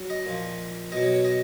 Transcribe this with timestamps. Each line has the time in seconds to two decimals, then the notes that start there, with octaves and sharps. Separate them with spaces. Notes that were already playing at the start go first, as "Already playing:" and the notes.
Already playing: F#3
0.10 D#5
0.26 A#2 F3
0.92 B2 F#3 D#5
1.03 C#5
1.14 C#5
1.25 D#5